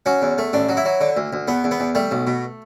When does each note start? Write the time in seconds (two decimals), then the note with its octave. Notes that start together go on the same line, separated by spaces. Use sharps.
0.06 F#3 C#4
0.22 E2
0.38 A3
0.53 A1 D4
0.69 F#3
0.77 E4
0.85 F#3
1.01 D3
1.17 D2
1.33 D2
1.48 E2 B3
1.64 E2
1.71 B3
1.80 E2
1.95 G3 A3
2.11 B1
2.27 B2